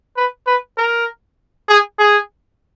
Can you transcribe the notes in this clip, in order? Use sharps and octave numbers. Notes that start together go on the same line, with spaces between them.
B4
B4
A#4
G#4
G#4